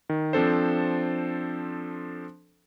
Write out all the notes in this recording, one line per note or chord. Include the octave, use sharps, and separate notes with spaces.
D#3
F3 C4 D4 A4 C5